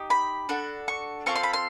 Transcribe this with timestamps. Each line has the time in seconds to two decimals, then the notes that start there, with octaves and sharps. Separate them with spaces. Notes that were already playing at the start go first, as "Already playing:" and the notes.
Already playing: D#4 G4
0.10 B5
0.49 D4 F#4 A4
0.88 C#6
1.26 C4 F4 A4 C#6
1.35 C6
1.43 B5
1.53 C6